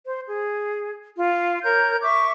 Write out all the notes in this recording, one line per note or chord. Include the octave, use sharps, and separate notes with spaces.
C5
G#4
F4
A#4 C#5 G6
E5 C#6 D6